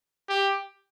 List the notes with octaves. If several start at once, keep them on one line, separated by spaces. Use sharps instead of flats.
G4